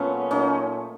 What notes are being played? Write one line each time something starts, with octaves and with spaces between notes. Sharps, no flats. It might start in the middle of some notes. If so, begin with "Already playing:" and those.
Already playing: A#2 F#3 A3 B3 C#4
A#2 F#3 A3 C#4 D#4